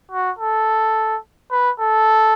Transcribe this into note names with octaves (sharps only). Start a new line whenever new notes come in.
F#4
A4
B4
A4